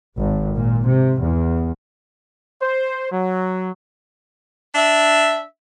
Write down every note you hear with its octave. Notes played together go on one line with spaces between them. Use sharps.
G#1
A#2
C3
E2
C5
F#3
D4 E5